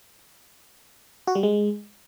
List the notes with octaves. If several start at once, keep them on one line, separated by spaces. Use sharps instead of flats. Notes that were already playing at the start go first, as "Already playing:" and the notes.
F#4
G3
G#3